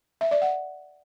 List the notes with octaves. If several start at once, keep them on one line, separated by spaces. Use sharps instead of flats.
E5
D5
F#5